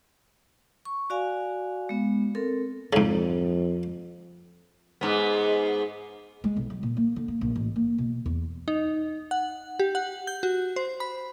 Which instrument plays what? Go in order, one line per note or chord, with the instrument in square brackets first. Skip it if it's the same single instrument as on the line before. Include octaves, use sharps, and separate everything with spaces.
[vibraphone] C#6
F#4 D5 F5 G#5
G#3 B3
C4 A4 A#4
[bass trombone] F2 [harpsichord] G#2 C#3
[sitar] G#2 B3
[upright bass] G#3
B1
F#3
A#2
A#3
D3
A#3
A#1
A1
A#3
B2
E2
[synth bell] D#4
F#5
G4
F#5
G6
F#4
C5
B5